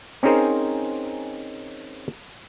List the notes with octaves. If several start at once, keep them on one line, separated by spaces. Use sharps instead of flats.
C4 C#4 D#4 G#4 A#4 C5